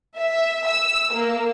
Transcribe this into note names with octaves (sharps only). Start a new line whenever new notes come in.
E5
E6
A#3